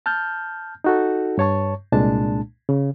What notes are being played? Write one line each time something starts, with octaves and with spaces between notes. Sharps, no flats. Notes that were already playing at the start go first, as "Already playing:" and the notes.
A5 F6 G6
D#4 F#4 A4
G2 C#5 A5 C#6
C2 A#2 G#3 D4 A5
C#3